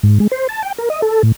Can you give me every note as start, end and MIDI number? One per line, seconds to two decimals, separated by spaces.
0.03 0.18 44
0.20 0.27 56
0.31 0.47 72
0.49 0.62 81
0.63 0.72 79
0.78 0.89 70
0.90 1.01 75
1.02 1.22 69
1.23 1.32 45